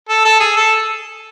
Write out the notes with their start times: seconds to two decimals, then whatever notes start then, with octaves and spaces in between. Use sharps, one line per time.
0.09 A4
0.25 A4
0.40 G#4
0.57 A4